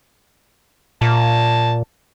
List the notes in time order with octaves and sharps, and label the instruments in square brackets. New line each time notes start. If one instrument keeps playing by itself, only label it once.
[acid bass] A#2 [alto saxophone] A5